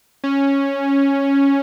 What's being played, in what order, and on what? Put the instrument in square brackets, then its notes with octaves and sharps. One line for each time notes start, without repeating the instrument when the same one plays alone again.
[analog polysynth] C#4